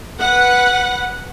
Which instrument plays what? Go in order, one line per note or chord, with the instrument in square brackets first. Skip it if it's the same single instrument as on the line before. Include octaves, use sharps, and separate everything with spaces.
[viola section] B4 F#5